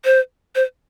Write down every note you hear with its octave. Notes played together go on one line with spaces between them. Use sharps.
C5
C5